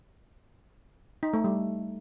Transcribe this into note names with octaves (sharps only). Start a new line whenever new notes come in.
D#4
A3
G3